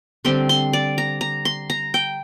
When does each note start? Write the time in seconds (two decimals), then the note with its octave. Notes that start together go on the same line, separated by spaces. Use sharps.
0.25 D3 G3 C4 C6
0.49 C6
0.73 D5
0.98 A#5
1.21 A#5
1.45 C6
1.70 A#5
1.94 G5